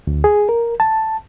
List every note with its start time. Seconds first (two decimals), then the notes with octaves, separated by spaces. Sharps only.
0.07 D2
0.24 G#4
0.49 A#4
0.80 A5